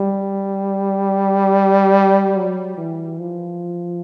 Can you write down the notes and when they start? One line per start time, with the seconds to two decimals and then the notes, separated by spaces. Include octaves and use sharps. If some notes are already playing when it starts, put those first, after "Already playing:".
Already playing: G3
2.36 F#3
2.78 E3
3.19 F3